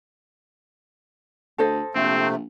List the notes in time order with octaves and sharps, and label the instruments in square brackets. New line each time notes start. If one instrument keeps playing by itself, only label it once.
[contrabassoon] D2 [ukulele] A4 C5 D#5
[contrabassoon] A#1 [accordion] C3 A3 [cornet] C4